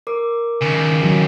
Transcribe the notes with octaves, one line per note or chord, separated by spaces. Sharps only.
A#4 D6
D#2 C#3
F#3